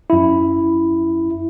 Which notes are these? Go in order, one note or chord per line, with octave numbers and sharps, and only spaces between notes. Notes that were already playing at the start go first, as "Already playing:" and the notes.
F#2 E4